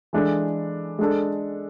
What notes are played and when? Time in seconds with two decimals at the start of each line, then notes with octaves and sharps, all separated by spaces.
0.13 E3 G#3 D4 A4
0.99 G#3 D4 A4